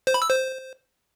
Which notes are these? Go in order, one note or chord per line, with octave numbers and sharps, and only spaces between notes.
C5
B5
E6
C5